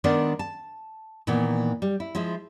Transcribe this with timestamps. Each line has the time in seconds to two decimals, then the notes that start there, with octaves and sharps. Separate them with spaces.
0.04 D#3 G#3 B3 D4 A#4 D5
0.39 A5
1.27 A#2 D#3 E3 A#3 B3
1.82 G3
2.00 E4
2.15 F3 G#3 E4